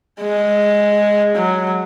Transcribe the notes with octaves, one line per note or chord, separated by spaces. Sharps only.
G#3
F#3